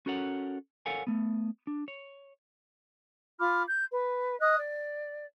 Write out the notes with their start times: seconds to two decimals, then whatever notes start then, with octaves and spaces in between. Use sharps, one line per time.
0.06 C#4 F#4 A4 A#4 C#5 F#5
0.86 A4 A#4 C#5 F5 F#5 G#5
1.07 A3 B3
1.67 D4
1.88 C#5
3.40 F4 B5 D6 F6
3.68 G6
3.92 B4
4.41 D#5 D#6 F#6
4.58 D5